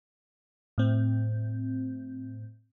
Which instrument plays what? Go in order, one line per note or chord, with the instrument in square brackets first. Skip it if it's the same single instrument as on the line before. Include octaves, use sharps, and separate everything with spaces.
[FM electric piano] A2 C4